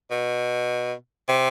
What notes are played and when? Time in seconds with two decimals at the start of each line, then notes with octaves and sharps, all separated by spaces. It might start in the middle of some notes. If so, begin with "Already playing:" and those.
0.11 B2
1.29 C3